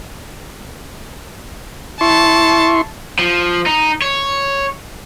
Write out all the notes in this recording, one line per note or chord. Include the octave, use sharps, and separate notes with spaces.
E4 A5 C6 C#6
F3
D#4
C#5